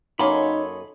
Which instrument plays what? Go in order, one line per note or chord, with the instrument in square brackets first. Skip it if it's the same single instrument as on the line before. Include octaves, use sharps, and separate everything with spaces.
[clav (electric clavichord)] F#2 A#3 [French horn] D#4 [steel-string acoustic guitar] A4 C#5 D#5 [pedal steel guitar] B5 C6